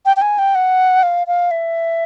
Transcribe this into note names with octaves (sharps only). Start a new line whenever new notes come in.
G5
G5
G#5
G5
F#5
F5
F5
E5